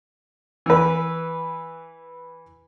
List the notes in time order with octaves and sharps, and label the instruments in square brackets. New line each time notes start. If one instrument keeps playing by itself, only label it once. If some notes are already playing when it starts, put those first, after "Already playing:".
[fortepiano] E3 B4